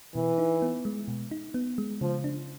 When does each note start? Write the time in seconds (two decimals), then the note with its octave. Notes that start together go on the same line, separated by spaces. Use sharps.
0.15 B2 E3
0.38 D#4
0.62 B3
0.85 G#3
1.08 B2
1.31 D#4
1.54 B3
1.78 G#3
2.01 C#3 F3
2.24 D4